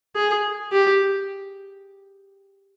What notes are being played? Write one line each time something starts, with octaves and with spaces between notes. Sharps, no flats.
G#4
G4